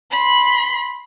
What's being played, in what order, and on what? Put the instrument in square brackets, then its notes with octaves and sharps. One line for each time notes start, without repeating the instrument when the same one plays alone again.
[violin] B5 C6